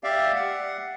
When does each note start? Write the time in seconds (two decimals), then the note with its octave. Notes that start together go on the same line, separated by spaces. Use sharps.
0.04 G4 D5 E5 F5
0.35 F#5